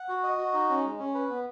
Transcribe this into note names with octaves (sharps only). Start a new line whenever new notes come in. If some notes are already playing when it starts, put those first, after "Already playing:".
Already playing: F#5
F#4
D#5
F#4
D#4
C#4
G#3
C#4
B4
B3